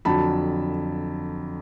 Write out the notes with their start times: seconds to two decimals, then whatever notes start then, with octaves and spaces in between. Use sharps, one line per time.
0.05 F2 D3 F#3 A5 B5